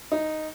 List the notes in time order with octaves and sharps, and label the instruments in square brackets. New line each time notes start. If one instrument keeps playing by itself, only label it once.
[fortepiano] D#4